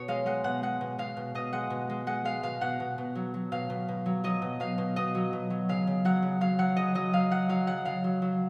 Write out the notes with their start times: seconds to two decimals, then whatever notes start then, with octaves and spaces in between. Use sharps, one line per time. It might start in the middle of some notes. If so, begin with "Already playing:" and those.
Already playing: B2 C#5
0.08 G#3 F5
0.26 G#3 F#5
0.44 B2 F#5
0.63 G#3 F#5
0.81 B2
0.98 B2 F5
1.17 B2
1.35 B2 D#5
1.53 G#3 F#5
1.70 B2
1.90 G#3
2.07 G#3 F#5
2.25 G#3 F5
2.43 B2 F5
2.61 B2 F#5
2.80 B2
2.98 B2
3.15 F#3
3.34 F#3
3.52 B2 F5
3.70 B2
3.88 B2
4.06 F#3
4.24 F#3 D#5
4.42 B2
4.60 B2 F5
4.78 B2
4.96 B2 D#5
5.15 F#3
5.33 B2
5.50 F#3
5.69 C#3 F5
5.87 C#3
6.05 F#3 F#5
6.22 C#3
6.41 F#3 F5
6.59 F#3 F#5
6.77 C#3 D#5
6.95 F#3 D#5
7.13 F#3 F5
7.31 F#3 F#5
7.49 F#3 F5
7.67 C#3 F#5
7.85 C#3 F5
8.04 F#3
8.22 F#3